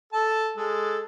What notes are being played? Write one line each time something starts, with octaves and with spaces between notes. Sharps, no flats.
A4 A5
G#3 A4